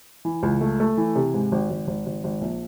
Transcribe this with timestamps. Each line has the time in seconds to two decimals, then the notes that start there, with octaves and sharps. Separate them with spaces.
0.25 E3
0.43 C#2
0.61 A3
0.80 A3
0.98 E3
1.16 C3
1.34 G#2
1.52 G#1
1.70 G#1
1.88 G#1
2.06 G#1
2.24 G#1
2.41 A#1